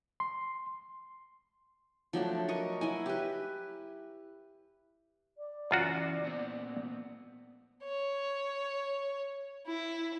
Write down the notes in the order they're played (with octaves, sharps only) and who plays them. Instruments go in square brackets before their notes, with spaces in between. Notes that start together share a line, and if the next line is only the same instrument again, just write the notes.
[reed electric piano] C6
[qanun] F3 F#3 A3 D4
A#4 D#5 C#6
F#3 E4 G#5
G4 B4
[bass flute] D5
[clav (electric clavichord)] F#2 F4 F#4 [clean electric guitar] C#3 E3
[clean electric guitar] A#2 B3 C4
[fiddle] C#5
E4